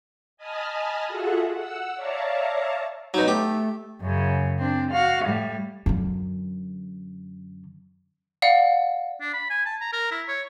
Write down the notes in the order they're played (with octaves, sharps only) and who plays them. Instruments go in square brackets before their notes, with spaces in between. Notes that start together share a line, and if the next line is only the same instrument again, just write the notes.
[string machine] D#5 G#5 A5 B5 D#6 F6
F4 F#4 G#4 A4 E5 F#5
F#5 E6
C#5 D5 E5 F5 A5 A#5
[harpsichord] B2 F#3 [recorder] D#4
[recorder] A3 [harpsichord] G4
[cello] F#2 C#3
C4 D4
F#4 F5
A2 G3
[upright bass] F#2 D3
[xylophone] D5 F5 F#5
[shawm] D4
B5
G#5
A5
A#5
A#4
E4
C#5